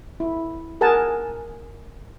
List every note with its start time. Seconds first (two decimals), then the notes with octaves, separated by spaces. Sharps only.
0.20 E4
0.81 G#4 A#4 F#5 G#5 A5